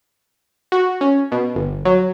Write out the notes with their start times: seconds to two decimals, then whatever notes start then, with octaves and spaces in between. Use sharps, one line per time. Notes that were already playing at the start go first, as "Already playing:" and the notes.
0.72 F#4
1.01 C#4
1.32 B2
1.55 G1
1.85 F#3